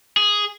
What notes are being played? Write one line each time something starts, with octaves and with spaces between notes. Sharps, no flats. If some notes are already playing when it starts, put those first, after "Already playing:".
G#4